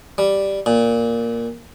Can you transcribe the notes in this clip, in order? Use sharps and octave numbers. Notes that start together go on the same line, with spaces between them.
G3
A#2